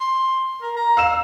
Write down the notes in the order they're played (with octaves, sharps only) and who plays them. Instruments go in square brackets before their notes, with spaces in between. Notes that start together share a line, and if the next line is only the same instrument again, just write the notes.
[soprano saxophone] C6
A#4
A#5
[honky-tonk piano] F5 E6 E7